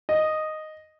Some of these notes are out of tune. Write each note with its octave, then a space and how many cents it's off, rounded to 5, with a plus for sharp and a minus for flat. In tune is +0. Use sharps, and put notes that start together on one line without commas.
D#5 -5